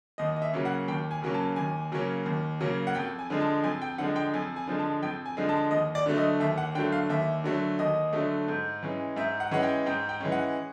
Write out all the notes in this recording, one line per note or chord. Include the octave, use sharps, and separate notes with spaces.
D#2 D#5
D#5
E5
C#3 F#3 A#3 C#4
F#5
D#2 G5
G#5
C#3 F#3 A#3 C#4
A5
D#2 G#5
C#3 F#3 A#3 C#4
D#2
C#3 F#3 A#3 C#4
F#5
F2 G5
G#5
D3 F3 G#3
A5
F2 G#5
G5
D3 F3 G#3 F#5
G5
F2 G#5
G#5
D3 F3 G#3
A5
F2 G5
G#5
D3 F3 G#3
A5
D#2 D#5
D5
D3 F#3 A3
D#5
D#2 E5
F#5
D3 F#3 A3 G5
F5
D#2 E5
D3 F#3 A3
D#2 D#5
D3 F#3 A3
G#2
E3 G#3 C#4
G#2 E5
F#5
E3 G#3 C#4 F#5
G5
G#2 G5
G5
E3 G#3 C#4
F#5